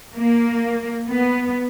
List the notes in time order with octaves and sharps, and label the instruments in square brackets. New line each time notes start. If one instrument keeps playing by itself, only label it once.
[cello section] A#3
B3